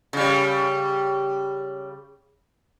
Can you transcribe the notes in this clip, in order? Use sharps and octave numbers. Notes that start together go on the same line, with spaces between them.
C#3 G3